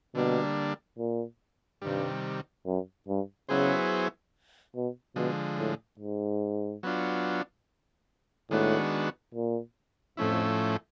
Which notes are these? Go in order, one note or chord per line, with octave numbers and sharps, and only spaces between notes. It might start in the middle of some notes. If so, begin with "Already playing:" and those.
B2 D3 G3 A#3 D4
A#2
G2 C3 D#3 G3
F#2
G2
C#3 F#3 B3 E4 G#4 C5
B2
B2 D3 F3 G#3
A2
G#2
F#3 B3 D4 F4
A2 D#3 G#3 B3 D4 F#4
A#2
F2 A2 F3 A3 C#4 E4